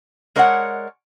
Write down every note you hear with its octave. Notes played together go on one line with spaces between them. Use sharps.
G#3 A#4 C#5 D5 E5 F#5